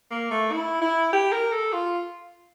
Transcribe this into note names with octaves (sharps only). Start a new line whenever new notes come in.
A#3
A3
E4
E4
G4
A#4
A4
F4